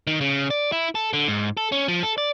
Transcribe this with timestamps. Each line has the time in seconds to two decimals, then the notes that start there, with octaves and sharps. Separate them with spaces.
0.07 D#3
0.21 C#3
0.50 D5
0.72 E4
0.95 A4
1.13 D3
1.28 G#2
1.57 A4
1.72 C#4
1.88 F3
2.03 A4
2.18 D5